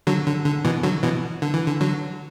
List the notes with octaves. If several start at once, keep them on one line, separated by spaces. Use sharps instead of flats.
D3 F#3
D3
D3
B2 E3
D3 F#3
B2 E3
D3
E3
D3
D3 F#3